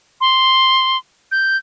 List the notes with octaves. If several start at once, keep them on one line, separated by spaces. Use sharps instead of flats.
C6
G6